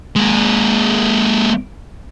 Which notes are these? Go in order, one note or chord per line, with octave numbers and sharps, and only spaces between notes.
G#3 A#3